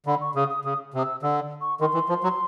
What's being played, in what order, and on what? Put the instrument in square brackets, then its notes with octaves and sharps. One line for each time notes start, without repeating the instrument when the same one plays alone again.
[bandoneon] D3 [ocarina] B5
[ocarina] C#6
[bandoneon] C#3 [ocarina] D#6
[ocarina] D#6
[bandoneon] C#3 [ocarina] D#6
[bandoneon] C3
[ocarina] D#6
E6
[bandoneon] D3 [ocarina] E6
[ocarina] C#6
[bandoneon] D#3 [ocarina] C6
[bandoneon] E3
F3
F#3